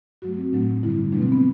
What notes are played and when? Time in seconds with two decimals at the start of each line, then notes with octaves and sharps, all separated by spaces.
0.22 G2 F#3 A3 F#4
0.37 C4
0.52 A2 F#3 A3 D4
0.83 G2 D3 G3 E4
1.12 B2 F#3 A3 D4
1.22 C4
1.32 B3